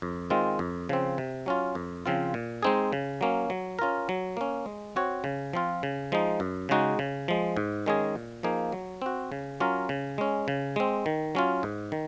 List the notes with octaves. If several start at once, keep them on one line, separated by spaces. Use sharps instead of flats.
F2
D#3 G#3 C4 F4
F2
C#3 F3 C4
C3
F#3 C#4 F4
F2
C#3 F3 C4 F4
A#2
G#3 C4 D#4 G#4
C#3
F#3 A#3 C#4
F#3
C#4 F4 A#4
F#3
A#3 C#4
G#3
C4 F#4 C#5
C#3
F3 C4 F4
C#3
F3 G#3 D#4
F#2
C#3 G#3 D#4 F#4
C#3
F3 G#3
G#2
D#3 G#3 C#4 G#4
A#2
F3 A#3 D#4 G#4
F#3
C4 F#4
C#3
F#3 C#4 F4 A#4
C#3
G#3 C#4
C#3
G#3 C4
D#3
F#3 C#4 F4
G#2
D#3